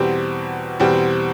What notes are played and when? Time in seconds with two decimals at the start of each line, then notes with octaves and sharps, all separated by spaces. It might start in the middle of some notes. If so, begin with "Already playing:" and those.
Already playing: E2 B2 G3 C4 G4
0.80 E2 B2 G3 C4 G4